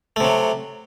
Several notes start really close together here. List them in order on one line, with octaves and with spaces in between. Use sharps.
A3 C3 F#3